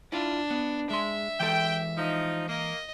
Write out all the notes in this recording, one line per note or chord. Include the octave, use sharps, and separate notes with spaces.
D4 E4 F4
B3
G#3 E5 C6
E3 G#3 A4 G5
F3 D#4
A#3 D#5